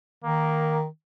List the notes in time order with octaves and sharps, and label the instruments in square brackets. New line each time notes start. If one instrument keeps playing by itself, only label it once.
[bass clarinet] D#3 [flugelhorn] A#3